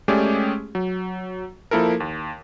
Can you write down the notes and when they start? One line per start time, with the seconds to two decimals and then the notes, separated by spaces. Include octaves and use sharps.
0.08 G#3 A3 C#4 G4 G#4 D5
0.75 F#3
1.71 F3 A#3 E4 A4 A#4
2.00 D#2